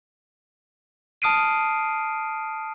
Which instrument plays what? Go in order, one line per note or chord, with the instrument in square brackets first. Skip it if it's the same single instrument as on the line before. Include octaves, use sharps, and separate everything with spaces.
[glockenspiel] A5 D#6 F6 C7 D7 D#7